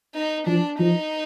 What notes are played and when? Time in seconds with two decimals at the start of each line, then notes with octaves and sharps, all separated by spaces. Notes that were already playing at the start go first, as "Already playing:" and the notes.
0.15 D#4
0.47 F3 D4
0.79 F3 D#4